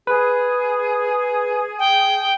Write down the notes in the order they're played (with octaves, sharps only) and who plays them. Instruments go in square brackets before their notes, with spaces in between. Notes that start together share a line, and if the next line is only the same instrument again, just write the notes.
[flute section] G#4 [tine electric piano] B4
[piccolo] G5